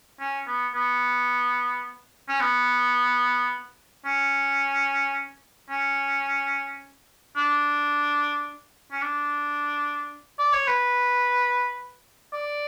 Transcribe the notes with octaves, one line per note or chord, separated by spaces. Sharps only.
C#4
B3
B3
C#4
B3
C#4
C#4
D4
C#4
D4
D5
C#5
B4
D5